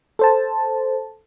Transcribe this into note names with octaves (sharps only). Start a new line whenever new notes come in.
A4 C5 A5